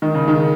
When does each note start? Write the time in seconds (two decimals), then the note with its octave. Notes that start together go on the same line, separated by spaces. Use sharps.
0.02 D#3
0.14 C#3
0.28 D#3